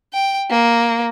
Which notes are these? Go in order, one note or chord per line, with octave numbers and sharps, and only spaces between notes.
G5
A#3